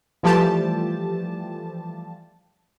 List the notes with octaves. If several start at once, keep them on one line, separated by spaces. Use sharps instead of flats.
E3 F3 G3 A3 G4 A5